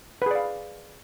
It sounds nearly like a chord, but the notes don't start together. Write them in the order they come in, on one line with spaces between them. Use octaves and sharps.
B4 G#4 D5 F5